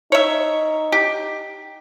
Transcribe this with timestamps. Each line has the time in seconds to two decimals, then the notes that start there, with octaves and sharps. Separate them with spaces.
0.12 D#4 C#5 E5
0.92 G4